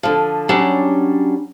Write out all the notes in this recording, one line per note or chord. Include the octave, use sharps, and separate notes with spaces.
D3 F3
F#3 G3 C#4 D4